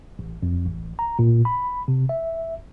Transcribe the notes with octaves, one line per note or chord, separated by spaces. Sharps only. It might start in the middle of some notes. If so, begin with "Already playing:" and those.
A1
F2
A1
A#5
A#2
B5
C3
E5